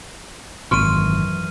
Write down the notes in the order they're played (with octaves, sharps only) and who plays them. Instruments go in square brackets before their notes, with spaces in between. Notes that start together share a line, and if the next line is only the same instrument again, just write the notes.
[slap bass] G#1 A#2 [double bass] F#2 E3 [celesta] C6 C#6 [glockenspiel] F6 D#7